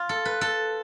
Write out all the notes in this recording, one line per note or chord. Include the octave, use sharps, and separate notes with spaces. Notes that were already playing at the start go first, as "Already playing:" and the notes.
Already playing: F4
A4
B4
A4